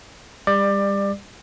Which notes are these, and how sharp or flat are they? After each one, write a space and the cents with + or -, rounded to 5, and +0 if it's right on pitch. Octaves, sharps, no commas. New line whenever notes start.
G3 +35 D5 +20